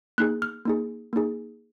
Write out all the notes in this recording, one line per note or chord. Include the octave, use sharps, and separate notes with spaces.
A#3 D#4 G#4 F#6
F6
A#3 D#4 G#4
A#3 D#4 G#4